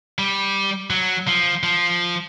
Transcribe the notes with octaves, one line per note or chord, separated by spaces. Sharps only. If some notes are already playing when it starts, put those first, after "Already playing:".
G3
F#3
F3
F3